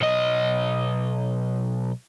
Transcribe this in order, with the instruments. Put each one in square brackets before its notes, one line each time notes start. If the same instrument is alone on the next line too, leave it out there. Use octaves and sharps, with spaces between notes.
[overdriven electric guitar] B1 D#5